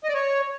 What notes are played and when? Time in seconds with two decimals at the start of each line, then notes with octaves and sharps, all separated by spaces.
0.04 D#5
0.09 D5
0.14 C#5